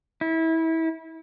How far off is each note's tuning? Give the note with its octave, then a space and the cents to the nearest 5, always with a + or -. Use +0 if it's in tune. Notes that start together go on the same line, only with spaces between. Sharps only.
E4 -25